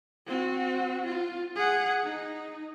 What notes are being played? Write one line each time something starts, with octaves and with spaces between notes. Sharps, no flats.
C4 F#4
F4
G#4 F#5
D#4